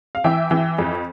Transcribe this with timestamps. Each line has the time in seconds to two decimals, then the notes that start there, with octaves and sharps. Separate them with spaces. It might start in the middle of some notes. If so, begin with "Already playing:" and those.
0.15 F5
0.24 E3 E5 G5
0.51 E3
0.78 F2